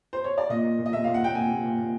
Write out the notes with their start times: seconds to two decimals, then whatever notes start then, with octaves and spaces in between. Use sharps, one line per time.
0.13 C5
0.24 C#5
0.38 D5
0.49 A#2 D#5
0.64 A#2
0.79 A#2
0.86 D#5
0.93 A#2 E5
1.04 A#2 F5
1.14 F#5
1.22 A#2 G5
1.35 A#2 G#5
1.50 A#2
1.65 A#2
1.78 A#2